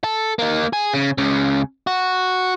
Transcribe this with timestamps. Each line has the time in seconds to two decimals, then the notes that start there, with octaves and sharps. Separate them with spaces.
0.04 A4
0.39 A#3 D#4
0.73 G#4
0.93 C#3
1.18 C#2 C#3
1.87 F#4